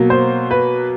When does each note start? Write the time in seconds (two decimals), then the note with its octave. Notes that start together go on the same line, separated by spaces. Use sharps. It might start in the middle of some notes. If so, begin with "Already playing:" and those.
Already playing: B2 F#3 A#3
0.10 C5
0.51 B4